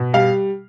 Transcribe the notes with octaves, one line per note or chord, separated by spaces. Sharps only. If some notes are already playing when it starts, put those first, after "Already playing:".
Already playing: B2
G3 F5